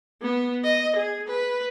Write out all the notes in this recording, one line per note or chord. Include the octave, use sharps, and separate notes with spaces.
B3
D#5
G#4
B4